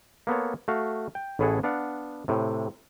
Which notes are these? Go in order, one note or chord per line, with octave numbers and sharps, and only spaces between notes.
A#3 B3 A4 C#5
A3 F#4 F5
G5
A1 A2 E4 G#4 A4 F#5
B3 D4 F5 F#5
A2 C3